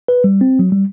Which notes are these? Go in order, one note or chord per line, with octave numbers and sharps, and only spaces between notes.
B4
G3
C4
F#3
G3